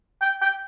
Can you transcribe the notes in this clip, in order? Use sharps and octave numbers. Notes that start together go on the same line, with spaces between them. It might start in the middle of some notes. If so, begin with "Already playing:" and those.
G5
G5